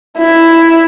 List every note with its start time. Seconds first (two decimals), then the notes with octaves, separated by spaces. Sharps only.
0.18 E4